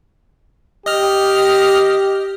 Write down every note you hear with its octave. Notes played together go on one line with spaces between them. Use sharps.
G4 D#5 F6